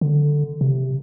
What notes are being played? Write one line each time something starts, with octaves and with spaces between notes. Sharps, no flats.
D3
C3